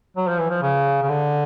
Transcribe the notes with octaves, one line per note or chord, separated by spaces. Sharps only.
F#3
F3
E3
F3
C#3
C#3
D3